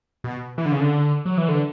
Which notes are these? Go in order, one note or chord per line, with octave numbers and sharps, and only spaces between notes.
B2
E3
D3
C#3
D3
F#3
E3
D3